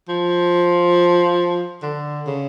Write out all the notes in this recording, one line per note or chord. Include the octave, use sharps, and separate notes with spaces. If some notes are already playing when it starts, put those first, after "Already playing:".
F3
D3
C#3